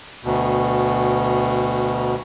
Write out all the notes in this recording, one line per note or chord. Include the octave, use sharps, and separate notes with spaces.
D2 B2